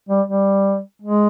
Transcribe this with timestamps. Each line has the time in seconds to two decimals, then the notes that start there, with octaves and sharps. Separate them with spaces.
0.09 G3
0.28 G3
1.02 G#3